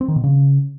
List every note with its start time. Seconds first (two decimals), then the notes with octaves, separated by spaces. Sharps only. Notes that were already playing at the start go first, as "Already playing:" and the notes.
0.01 C4
0.08 D#3
0.16 B2
0.24 C#3